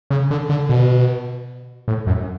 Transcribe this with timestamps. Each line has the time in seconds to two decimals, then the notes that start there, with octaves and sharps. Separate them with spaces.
0.10 C#3
0.31 D3
0.49 D3
0.69 B2
1.88 A2
2.07 F#2